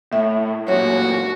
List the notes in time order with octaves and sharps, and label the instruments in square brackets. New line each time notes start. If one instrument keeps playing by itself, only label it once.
[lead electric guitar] A2 [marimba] E5
[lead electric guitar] F#2 A#2 [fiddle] F#4 [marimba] C#5